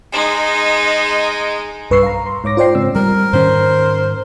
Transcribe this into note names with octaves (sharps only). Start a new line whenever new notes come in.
G#3 D#4
B1 G2 B4 C#6 E6 C7
F5 A#5
C6
G#2 C#5 D6 A#6
F4 C5 D5 G5 C7
G#2 C#3 C4 E6
G3 A#4
G#2 D#3 C#4 C5